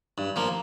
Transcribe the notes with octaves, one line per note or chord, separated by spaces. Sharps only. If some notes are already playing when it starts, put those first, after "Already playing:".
G2
F3 A#3